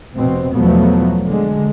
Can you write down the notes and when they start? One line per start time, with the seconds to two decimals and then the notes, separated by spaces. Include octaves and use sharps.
0.14 F1 B2 C4
0.54 E2 B2 F3 F#3 A3 B3
1.23 D3 G#3